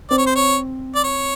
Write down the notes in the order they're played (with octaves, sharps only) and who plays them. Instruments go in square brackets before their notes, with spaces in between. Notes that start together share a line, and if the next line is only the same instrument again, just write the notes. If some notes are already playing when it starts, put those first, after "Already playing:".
[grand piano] C4 [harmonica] D5
[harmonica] C#5
C5
C#5
D5
C#5